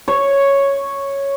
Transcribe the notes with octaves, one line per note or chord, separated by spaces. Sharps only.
C#5